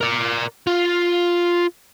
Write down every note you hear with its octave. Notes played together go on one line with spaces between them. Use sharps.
A#4 D5
F4